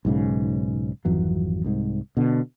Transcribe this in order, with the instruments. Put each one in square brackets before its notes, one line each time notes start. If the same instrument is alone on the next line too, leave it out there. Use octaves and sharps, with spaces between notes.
[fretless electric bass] B1 G#2 C#3
G#1 F2 E3 F#3
C2 G#2
B2 D3